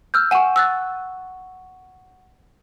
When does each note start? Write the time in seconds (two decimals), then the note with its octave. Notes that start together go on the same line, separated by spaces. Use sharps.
0.14 E6 F6 G6
0.31 F#5 G#5 C#6 E7
0.56 E6 F#6 A6